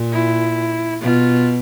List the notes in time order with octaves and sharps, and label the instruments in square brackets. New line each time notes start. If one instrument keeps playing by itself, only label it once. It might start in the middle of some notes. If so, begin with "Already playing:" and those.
Already playing: [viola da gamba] A#2
[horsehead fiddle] E4
[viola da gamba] B2 [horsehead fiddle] F4